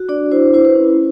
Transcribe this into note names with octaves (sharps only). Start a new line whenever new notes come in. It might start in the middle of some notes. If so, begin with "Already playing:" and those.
Already playing: F#4
D4 D5
E4 C5
E4 C5
B4
C#4